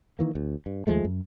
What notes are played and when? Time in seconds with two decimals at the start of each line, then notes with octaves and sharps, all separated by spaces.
0.19 D#3 E3 A#3
0.35 D2
0.66 G2
0.87 D#2 F3 G#3 A3
1.04 F#2